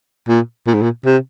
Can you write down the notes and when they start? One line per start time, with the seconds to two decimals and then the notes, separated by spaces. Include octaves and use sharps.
0.28 A#2
0.67 A#2
0.74 G#2
0.82 A#2
1.05 C3